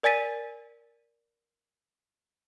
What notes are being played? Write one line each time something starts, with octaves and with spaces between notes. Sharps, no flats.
A#4 D5 G#5 A6 B6 D#7